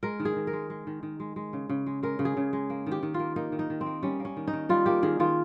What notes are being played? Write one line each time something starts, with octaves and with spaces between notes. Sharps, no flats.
G#3 A#4
D#3
G#4
D#3
A#4
G#3
G#3
D#3
D#3
G#3
G#3
C#3
C#3
G#3
G#3 A#4
C#3
G#4
C#3
G#3
A#3
D#3
G4
D#3
F4
A#3
A#3 D#4
D#3
D#4
D#3
C4
A#3
G3 C#4
A#3
C#4
D#3
D#4
D#3
G3 F4
A#3 G4
D#3 G#4
D#3 F4